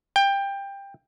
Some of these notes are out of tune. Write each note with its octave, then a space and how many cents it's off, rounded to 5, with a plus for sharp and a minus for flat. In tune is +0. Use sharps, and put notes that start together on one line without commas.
G5 +20